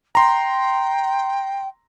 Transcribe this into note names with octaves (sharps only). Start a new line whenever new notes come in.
G5 A#5 C6